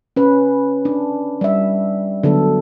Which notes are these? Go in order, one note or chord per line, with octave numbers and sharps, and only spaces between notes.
C#4 B4
D4
G3 E5
D3 F#3 B3 A4